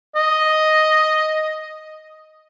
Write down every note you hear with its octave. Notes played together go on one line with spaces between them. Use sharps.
D#5